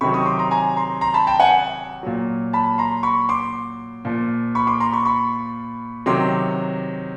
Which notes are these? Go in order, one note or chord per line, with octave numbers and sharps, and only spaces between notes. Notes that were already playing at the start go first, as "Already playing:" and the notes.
C3 D#3 F#3 B5 C#6
C#6 D#6
C6 D6
A#5 C6
G#5 A#5
A#5 C6
A#5 C6
A5 B5
G5 A5
F#5 G#5
A#2 F#3
A5 B5
A#5 C6
B5 C#6
C6 D6
A#2 F3
B5 C#6
C6 D6
A#5 C6
B5 C#6
B5 C#6
C3 D#3 F#3 C6 D6